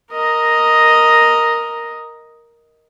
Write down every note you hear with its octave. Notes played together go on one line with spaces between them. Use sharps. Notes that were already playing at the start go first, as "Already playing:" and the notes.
A#4 D#5